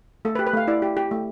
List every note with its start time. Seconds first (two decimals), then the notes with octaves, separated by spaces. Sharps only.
0.25 A3 A4
0.35 B4
0.39 G4
0.47 B4
0.53 A3 F5
0.68 E4 D5
0.82 G4
0.97 G4
1.11 A3